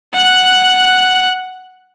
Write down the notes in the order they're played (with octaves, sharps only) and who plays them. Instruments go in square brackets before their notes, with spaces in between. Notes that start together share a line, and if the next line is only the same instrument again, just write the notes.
[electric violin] F#5 F#6